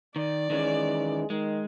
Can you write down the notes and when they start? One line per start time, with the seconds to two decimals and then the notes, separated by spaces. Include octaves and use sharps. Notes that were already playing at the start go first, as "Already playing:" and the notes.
0.16 D#3 D5
0.50 D#3 E3 G#3 C#4
1.30 D#3 G#3